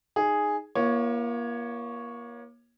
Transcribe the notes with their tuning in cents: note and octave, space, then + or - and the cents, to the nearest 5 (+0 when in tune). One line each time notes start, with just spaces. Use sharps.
D#4 +0 G#4 +0
A#3 +35 F4 -35 C#5 +0